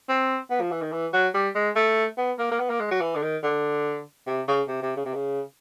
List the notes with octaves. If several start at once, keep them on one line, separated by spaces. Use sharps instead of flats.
C4
B3
F3
E3
D#3
E3
F#3
G3
G#3
A3
B3
A#3
A#3
B3
A#3
G#3
F#3
E3
D3
D#3
D3
C3
C#3
C3
C3
C#3
C3
C#3